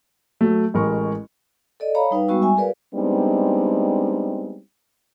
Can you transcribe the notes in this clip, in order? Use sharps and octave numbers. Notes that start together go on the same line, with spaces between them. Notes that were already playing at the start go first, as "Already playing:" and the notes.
F#3 A3
A1 G#3 A#4 C#6
A4 D5 D#5
C#5 F5 A#5 B5
G3 D#4 B4 F5
G3 G#3 B3 F#4 C#6 E6
E5 G#5
F#4 G#4 A#4 B4 D5 F5
G3 G#3 B3 C4 D4 D#4